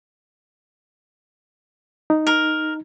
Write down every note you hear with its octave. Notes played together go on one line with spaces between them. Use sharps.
D#4
A#4